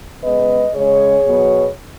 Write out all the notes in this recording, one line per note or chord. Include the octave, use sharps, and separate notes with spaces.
C#3 G#3 B3 B4 D#5
C#3 G#3 C#4 G#4 C#5
B2 F#3 B3